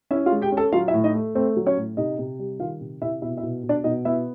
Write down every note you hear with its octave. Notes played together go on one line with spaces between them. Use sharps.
C#4 E4 E5
F4 F5
G#3
G4 G5
C#4
A4 A5
F#3 F4 F5
E4 E5
A2
D#4 D#5
A3
A3 C4 C5
F#3
C#4 C#5
A2
C3 D#4 D#5
C3
G3
D#3 F4 F5
C3
C3 E4 E5
B2 E4 E5
E4 E5
B2
B2
D4 D5
B2 D#4 D#5
B3 E4 E5